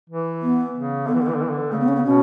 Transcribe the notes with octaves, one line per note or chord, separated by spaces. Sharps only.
E3
B3
C#3
D3 B3
E3
D3
E3
D3
E3
D3
C#3 A3
B3
C#4
B3
B2 C#4